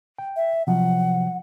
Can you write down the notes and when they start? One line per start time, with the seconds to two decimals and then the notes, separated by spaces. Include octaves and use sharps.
0.19 G5
0.36 E5
0.67 C3 F3 F#3 F#5